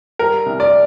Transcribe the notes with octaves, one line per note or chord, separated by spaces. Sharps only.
G3 A#4
C2
D5